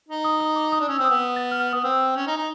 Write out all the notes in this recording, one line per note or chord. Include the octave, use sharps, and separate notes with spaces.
D#4
D#6
D#6
D6
D#6
D4
C#4 E6
C4 E6
D#6
B3
D#6
A6
F6
B3 D#6
C4 E6
C#4
D#4
D#4